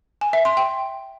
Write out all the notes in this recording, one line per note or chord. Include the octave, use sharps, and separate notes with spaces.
G#5
E5
C6
G5